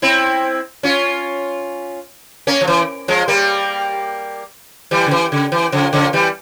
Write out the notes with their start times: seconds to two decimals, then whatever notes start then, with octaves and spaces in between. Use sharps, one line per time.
0.02 C4 E4
0.83 C#4 F4
2.47 A#3 C#4
2.61 F3
2.68 E3
3.08 F3 G#3
3.28 G3 A#3
4.91 E3 G3
5.06 C#3
5.11 E3
5.32 C#3
5.52 E3
5.72 C#3 F3
5.93 C#3 F3
6.13 E3 G3